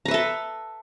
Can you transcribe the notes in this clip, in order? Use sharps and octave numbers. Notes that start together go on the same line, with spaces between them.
A4 B4 E5 A#5